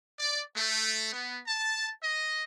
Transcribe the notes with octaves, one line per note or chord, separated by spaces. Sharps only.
D5
A3
B3
A5
D#5